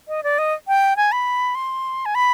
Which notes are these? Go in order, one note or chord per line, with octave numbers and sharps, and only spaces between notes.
D#5
D5
D#5
G5
G#5
B5
C6
G#5
B5